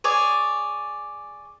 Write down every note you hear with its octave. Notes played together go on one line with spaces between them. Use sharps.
G#4 C#5 D5